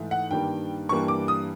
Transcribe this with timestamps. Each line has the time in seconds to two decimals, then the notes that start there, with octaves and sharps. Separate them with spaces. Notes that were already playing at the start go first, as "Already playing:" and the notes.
Already playing: G#2 E3 A3
0.11 F#5
0.31 G2 D#3 G3 A#3 G5
0.89 G2 E3 G3 A#3 C#6
1.08 D6
1.28 D#6